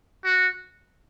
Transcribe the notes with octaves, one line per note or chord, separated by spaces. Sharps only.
F#4